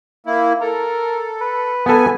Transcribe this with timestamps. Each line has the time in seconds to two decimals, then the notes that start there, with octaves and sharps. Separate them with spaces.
0.26 A#3 E4
0.62 A4 A#4
1.41 B4
1.86 B3 A4 G#5